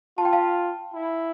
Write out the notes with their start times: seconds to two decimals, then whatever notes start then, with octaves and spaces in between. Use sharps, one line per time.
0.18 F4 A5
0.25 G5
0.33 F5 A5
0.94 E4